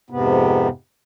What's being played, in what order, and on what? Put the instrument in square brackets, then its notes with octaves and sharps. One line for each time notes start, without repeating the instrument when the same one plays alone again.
[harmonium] F2 G#2 C3 B3